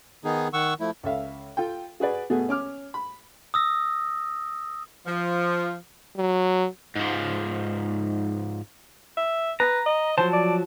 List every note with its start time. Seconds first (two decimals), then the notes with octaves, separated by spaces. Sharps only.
0.25 D#3 B3 D#4 G#4
0.53 D#3 F#5 C#6 E6
0.80 F3 A3 E4
1.03 C#2 A4 E5 F5
1.57 F4 A4 G5
2.00 F#4 G#4 B4 D5
2.30 B2 A3 B3 F#4 G#4
2.49 C#4 D6 F6
2.94 B5
3.54 D#6 E6 A#6
5.06 F3
6.17 F#3
6.95 G#2 F3
9.17 E5
9.60 B4 A#5
9.86 D#5
10.18 F3 F#3 C5 A5
10.33 D5